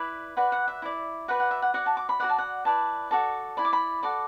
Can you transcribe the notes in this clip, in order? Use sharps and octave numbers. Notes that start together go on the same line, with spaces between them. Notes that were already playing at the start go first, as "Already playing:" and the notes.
Already playing: E4 B4 D5 B5
F#4 B4 D5 F#5
F#5
E5
E4 D5
F#4 B4 D5 F#5
F#5
E5
F#5
F#4 D5 F#5
A5
D6
B5
F#4 A4 D5 F#5
A5
F#5
E4 B4 D5 A5
F#4 A4 D5 A5
E4 D5 B5
D6
B5
F#4 A4 D5 D6